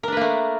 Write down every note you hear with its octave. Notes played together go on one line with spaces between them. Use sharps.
A3 A#3 D4 A#4 B4